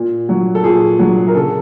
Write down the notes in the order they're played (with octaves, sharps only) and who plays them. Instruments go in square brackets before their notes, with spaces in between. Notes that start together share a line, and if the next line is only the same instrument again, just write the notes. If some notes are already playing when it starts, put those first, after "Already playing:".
Already playing: [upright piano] A#2
F#3
A4
A#2 G#4
F#3
A#4
C#3 A4